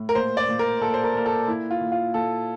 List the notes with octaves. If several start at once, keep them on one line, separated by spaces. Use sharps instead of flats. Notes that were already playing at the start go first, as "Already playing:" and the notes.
Already playing: A2
A#4
A#2 C5
D5
A#2
A#4
A#2 A4
C5
A#4
A#2 A#4
A4
A#2 E4
F4
A#2
F4
A#2 A4